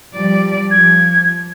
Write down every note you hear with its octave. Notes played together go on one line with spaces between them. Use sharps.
F3 G3 D5
F3 G#6